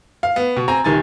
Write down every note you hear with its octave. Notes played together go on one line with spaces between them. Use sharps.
F5
B3
B2
C4 G#5 A#5
D#1 D#3 G#5 A6